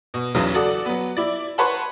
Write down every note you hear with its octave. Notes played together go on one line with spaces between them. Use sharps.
B2
B1 E2 C#3 F#3
F#4 A4 D5 D#6
F#3 B3
E4 D5
B4 C#5 F#5 A5 B5 C6